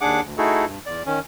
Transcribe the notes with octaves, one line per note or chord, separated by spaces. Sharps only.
D#2 D4 G#4 F#5 D6
D2
A3 D#4 E4 F#4 G#4 A4
G2
E2 D5
D#3 C#4